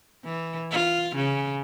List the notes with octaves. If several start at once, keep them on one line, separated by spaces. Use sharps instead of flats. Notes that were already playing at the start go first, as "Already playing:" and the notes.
E3
F4
C#3